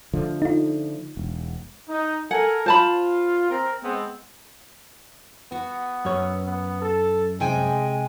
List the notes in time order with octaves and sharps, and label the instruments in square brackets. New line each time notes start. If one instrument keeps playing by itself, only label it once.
[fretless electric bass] D3 F3 A3
[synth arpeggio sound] D#4 F4
[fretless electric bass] E1
[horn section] D#4
[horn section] A4 A#4 G#5 [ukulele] F#5
[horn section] F4 [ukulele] C5 A5 B5
[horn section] C4 A#4
G#3 B3 C4
[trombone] B3 [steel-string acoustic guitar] F#4
[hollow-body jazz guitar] F#2 C#5
[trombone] B3
A4
[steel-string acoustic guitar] C3 G5 G#5 [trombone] G#3